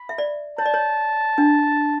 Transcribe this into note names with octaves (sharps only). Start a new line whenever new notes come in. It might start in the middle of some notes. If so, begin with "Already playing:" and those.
Already playing: B5
E5
D5
C#5 A5
D5
C#5
D4